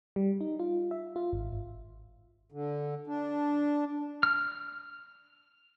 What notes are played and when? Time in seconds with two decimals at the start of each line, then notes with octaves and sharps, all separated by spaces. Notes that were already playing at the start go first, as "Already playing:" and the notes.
0.16 G3
0.41 D#4
0.59 F4
0.91 E5
1.16 F4
1.33 G#1
1.53 G#1
2.52 D3
3.07 D4
4.23 F6